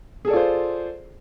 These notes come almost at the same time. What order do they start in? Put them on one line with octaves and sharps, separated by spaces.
G#4 A4 D5 F4 C5